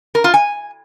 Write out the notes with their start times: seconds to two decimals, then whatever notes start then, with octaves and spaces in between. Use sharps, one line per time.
0.15 A#4
0.24 F4
0.34 G#5